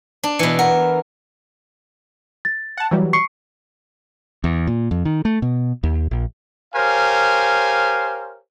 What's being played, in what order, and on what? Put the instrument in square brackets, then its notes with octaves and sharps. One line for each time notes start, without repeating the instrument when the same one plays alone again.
[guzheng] D4
[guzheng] B2 E3 [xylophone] C#7
[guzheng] A#4 [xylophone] F#5
[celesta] A6
[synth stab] F#5 A5
E3 F#3 G3
[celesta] C#6 C7 C#7
[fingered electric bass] E2
A#2
F2
D#3
A3
B2
D#2
A#1
[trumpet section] G4 A#4 C5 C#5 F5 G#5